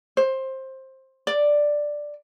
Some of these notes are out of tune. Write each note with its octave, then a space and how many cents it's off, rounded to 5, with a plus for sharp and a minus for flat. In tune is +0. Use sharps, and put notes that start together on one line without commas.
C5 +15
D5 +5